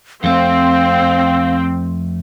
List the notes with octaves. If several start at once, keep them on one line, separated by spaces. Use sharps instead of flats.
F2 A3 C4 F5